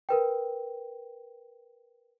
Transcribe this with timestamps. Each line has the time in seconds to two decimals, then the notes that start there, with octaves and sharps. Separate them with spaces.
0.09 A#4 B4 G5